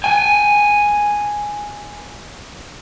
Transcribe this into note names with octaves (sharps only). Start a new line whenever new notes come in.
G#5 A5